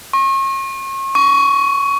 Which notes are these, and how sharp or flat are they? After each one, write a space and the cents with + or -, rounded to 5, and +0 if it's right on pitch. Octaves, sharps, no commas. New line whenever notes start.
C#6 -40
C#6 +20